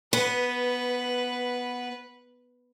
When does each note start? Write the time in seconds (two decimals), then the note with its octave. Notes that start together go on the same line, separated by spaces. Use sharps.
0.13 B3 B4